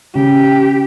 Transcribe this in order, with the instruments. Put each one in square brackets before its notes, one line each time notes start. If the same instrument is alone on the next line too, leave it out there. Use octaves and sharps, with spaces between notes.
[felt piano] C#3 [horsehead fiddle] G4